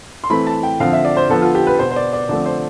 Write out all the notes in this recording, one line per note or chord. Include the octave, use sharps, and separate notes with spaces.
C6
E3 A3 C4 B5
A5
G5
D3 F3 C4 F5
E5
D5
C5
D3 F3 B3 A4
F4
G4
B4
B2 B3 C5
C5
D5
D5
D3 F3 A3 C4 D5
C5